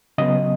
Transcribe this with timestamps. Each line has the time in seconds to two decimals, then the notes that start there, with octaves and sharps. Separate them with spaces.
0.18 C#3 F#3 B3 D#5